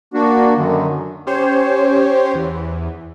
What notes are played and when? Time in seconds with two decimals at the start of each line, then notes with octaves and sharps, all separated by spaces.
0.14 A#3 D4 F#4
0.56 F#2 D3 D#3
1.27 C#4 G4 C5 C#5
2.34 E2 E3